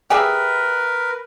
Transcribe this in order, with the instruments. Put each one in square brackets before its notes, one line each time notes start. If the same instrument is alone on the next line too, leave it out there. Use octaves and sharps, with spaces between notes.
[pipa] G4 G#4 E5 [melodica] A#4 B4